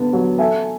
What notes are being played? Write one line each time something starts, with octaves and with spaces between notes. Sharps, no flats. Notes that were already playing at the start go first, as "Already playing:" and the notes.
Already playing: D3 B3
F#3
A3 E5 G#5